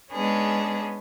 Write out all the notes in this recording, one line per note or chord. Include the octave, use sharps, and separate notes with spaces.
G#3 B3 C#4 D4 G#4